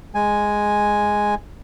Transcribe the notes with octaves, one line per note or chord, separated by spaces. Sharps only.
G#3 G#5